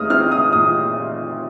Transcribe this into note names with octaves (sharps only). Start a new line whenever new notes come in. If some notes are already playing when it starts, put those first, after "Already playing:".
Already playing: A#2 G#3 D#4 D#6 F6
C4 F6
D#6
A#2 D#6